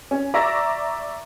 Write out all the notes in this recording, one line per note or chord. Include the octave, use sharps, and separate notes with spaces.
C#4
D5 E5 A#5 C#6 E6 A#6